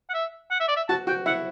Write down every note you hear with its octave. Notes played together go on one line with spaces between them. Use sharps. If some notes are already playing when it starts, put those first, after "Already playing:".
F#5
E5
F#5
E5
D5
E5
F#4 A5
F#4 G5
E4 F#5